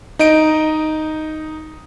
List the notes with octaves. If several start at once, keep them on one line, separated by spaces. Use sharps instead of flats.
D#4 D#5 D7